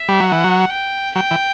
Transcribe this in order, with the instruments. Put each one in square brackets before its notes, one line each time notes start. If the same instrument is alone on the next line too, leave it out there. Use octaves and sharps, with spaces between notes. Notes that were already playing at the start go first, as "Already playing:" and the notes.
Already playing: [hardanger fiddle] E5
[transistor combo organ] G3
[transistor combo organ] F#3 [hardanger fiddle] F#5
[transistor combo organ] E3
F#3
[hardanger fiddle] G5
[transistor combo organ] F#3 [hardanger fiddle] G5
[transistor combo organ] E3